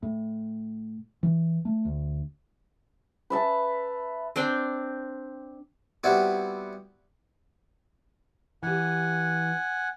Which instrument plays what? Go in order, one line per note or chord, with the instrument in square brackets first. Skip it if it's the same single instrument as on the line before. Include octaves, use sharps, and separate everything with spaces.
[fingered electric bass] A2
E3
A3
D2
[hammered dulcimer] B4 E5 A5
[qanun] C4 D4 G5
[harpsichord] G3 B3 C4 E4 F#4
[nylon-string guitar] E3 G4 [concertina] F#5 G#5